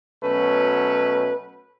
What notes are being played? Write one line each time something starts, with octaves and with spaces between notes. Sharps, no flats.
B2 F#3 A3 C#4 B4